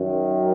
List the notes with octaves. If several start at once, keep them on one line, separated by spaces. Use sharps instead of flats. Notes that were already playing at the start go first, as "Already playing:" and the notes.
Already playing: F#2 D#3 F#3